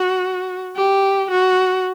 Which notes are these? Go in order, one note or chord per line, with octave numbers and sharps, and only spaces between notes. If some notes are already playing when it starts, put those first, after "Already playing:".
Already playing: F#4
G4
F#4